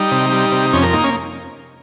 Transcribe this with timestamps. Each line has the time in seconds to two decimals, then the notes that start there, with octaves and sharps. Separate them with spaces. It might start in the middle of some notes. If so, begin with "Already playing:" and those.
Already playing: G3 D#4
0.11 C3
0.32 G3
0.52 C3
0.73 F2 C#4
0.83 A#4
0.93 A#3 D#4
1.04 C#4